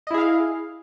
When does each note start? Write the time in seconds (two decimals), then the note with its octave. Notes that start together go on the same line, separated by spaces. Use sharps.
0.07 D#5
0.11 E4
0.14 G#4
0.18 F5